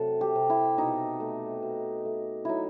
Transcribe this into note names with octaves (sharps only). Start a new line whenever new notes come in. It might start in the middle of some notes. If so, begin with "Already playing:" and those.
Already playing: C3 F#3 A3 A4
G4
C3
E4
B2 D#4
A3
B2
A3
F#3 D#4 E4